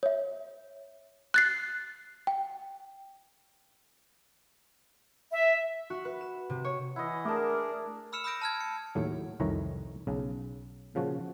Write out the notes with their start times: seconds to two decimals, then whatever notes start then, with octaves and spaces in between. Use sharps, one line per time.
0.03 C#5 E5
1.34 F#6 A6 C7
2.27 G5
5.30 E5
5.90 F#4
6.05 B4
6.21 E7
6.50 C3
6.64 C#5
6.96 E3 E4 D#5 F#5
7.25 A3 D4 G#4 A#4 A5 D6
8.12 B5 E6 F6 C#7 E7 F7
8.24 B5 D#6 E6 G6 A#6 D7
8.42 A5 F6 G#6
8.61 C#7
8.95 D#2 A2 F#3
9.40 C2 F2 D#3 C#5 E5 A#5
10.07 B1 C#3
10.95 A#2 C#3 F3 F#4